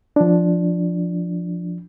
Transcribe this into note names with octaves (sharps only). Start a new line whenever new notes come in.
F3 D4